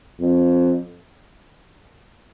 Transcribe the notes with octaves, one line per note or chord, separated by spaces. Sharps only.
F2